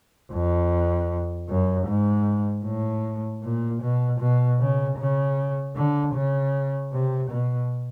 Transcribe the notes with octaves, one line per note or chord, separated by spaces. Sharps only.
F2
F#2
G#2
A2
A#2
B2
B2
C#3
C#3
D3
C#3
C3
B2